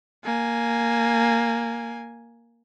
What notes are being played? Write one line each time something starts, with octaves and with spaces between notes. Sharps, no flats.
A#3 G#5